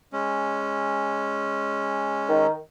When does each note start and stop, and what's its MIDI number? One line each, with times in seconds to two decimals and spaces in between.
0.13 2.47 56
0.13 2.47 61
2.29 2.53 51